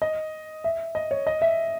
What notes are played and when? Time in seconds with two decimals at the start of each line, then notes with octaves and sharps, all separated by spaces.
0.02 D#5
0.64 E5
0.95 D#5
1.11 C#5
1.27 D#5
1.42 E5